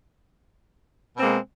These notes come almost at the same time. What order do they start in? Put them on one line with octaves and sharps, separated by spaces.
B2 C4 A#3 G#3